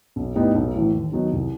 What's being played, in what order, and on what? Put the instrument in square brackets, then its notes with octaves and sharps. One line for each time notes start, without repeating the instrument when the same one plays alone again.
[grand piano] B1
A2 G3 B3 D#4
B1
A2 E3
D#2
D#3 F#3 B3 D#4
C2